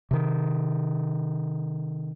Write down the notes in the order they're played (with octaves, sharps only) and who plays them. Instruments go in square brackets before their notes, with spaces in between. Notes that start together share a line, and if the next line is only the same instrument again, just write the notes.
[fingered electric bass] C3 D#3